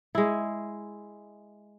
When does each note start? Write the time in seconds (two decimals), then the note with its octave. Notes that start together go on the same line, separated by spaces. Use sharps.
0.15 G#3 E4